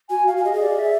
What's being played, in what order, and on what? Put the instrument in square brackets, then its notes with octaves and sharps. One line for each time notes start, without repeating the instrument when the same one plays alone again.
[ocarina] F#4 [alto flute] G#5
[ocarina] F#4 [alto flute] F5
[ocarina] F#4
[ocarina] G4 [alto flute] D#5
[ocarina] G#4
[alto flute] D5
E5